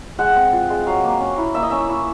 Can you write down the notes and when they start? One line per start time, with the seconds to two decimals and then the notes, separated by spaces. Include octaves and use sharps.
0.19 G#3 F#5
0.36 C4
0.53 F4
0.70 G#3
0.86 F#3 F5
1.04 A#3
1.20 C#4
1.38 E4
1.55 A#3 E5
1.62 D#5
1.70 C#4 E5
1.89 E4